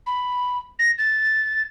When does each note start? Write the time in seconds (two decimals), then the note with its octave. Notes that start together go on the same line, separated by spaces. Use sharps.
0.07 B5
0.79 A#6
0.98 A6